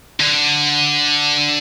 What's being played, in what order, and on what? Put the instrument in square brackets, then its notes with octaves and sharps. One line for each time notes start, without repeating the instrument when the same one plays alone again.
[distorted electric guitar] D3